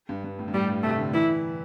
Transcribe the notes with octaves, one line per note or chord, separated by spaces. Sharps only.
G2
G2
A2
G2
A2 G3
G2
C3 A3
D3
E3 E4